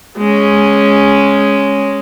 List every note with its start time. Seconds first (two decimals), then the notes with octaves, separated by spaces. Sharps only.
0.18 G#3 C#4